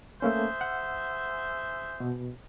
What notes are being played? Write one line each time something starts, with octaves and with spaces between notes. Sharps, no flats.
A3 A#3 C#4 G#4 C5 E5
F#5
B2